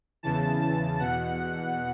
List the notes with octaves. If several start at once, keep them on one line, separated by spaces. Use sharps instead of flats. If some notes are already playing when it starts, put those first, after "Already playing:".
E2 C#3 E3 A5
A5
E2 B2 F#5